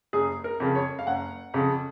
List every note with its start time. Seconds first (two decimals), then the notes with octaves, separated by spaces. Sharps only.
0.13 F#1 G#4
0.44 A#4
0.60 F2 C#3
0.75 C#5
0.99 F5
1.07 F#1 F#5
1.54 F2 C#3